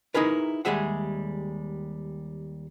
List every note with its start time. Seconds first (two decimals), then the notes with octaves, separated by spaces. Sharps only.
0.14 D#4 E4 G#4 A#4 B4
0.65 D#2 G3 G#3 G#4 E5 F#5